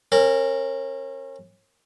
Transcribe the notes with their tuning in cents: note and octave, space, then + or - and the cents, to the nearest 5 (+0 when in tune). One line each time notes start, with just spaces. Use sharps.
C#4 -35 A#4 -10